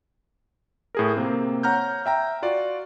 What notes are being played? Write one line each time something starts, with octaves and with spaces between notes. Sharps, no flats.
A2 G#4 A#4
C3 A#3 C4
C#5 F#5 A#5 F6 G6
E5 G5 A#5
F4 F#4 D5